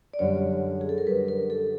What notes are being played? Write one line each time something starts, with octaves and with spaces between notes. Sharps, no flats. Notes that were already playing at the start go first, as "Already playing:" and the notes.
D5
F#2 D3 G3 C#5
G#4
A4
A#4
F#2 D3 G3 B4
A#4
A4